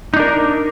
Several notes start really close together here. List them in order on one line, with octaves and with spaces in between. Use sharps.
D#4 D4 A#4